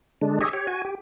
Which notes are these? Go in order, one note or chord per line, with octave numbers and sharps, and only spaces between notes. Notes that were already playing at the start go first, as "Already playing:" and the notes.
D3 G#3 D4
G4 G#4 C#5 D#5 E5
G4 C#5
F#4 G#5
G4